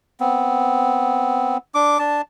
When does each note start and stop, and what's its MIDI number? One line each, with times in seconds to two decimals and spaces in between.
0.20 1.57 59
0.20 1.57 60
1.74 1.99 62
1.74 1.99 86
1.99 2.22 62
1.99 2.22 81